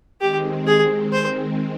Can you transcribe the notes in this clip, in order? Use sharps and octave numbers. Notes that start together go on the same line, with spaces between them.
D#3 G#3 C4 G4
G#4
C5